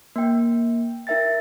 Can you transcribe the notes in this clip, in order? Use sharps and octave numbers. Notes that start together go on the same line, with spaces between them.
A#3 G5
D#4 A#4 E5 G5 A6